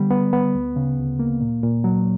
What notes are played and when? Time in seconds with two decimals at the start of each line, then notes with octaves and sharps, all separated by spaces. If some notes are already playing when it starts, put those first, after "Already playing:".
Already playing: D3 G3 B3
0.11 B3
0.33 B3
0.55 D2
0.76 C#3
0.98 D2
1.19 A#3
1.41 A#2
1.63 A#2
1.84 F#3